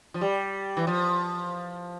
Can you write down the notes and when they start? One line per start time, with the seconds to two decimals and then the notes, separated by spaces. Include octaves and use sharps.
0.14 F3
0.21 G3
0.77 E3
0.87 F3